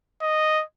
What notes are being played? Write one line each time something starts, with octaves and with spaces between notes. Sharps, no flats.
D#5